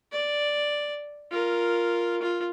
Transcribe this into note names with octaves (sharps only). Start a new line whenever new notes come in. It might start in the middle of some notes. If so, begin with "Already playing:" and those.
D5
F4 A#4
F4